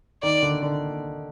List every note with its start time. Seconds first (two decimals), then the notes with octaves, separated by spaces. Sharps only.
0.23 D#3 D5
0.43 D3
0.62 D3